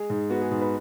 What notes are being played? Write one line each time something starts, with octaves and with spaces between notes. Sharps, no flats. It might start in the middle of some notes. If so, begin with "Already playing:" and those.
Already playing: G#3 G#4
G#2
B3 F#4
G#4
G#2 G#4
B4